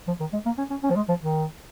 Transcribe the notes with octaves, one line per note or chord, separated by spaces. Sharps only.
F3
D#3
G#3
A#3
C#4
C#4
C#4
F3
G#3
F3
D#3